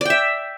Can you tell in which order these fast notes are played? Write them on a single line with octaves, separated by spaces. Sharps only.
D5 G5 E5